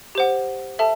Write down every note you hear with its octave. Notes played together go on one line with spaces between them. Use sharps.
G4 C5 F#5
A4 E5 A5